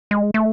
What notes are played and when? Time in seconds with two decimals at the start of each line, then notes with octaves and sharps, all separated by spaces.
0.11 G#3
0.34 A3